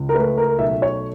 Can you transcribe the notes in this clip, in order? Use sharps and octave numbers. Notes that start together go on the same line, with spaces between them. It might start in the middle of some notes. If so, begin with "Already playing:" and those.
Already playing: C#2
A#4
A3 B4
A#4
B1 E5
C#5